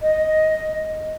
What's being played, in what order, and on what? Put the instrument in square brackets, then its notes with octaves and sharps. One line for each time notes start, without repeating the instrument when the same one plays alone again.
[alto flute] D#5